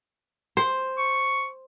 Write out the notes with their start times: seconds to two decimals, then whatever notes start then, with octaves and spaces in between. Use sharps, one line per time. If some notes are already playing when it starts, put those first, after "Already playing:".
0.57 C5
0.98 C#6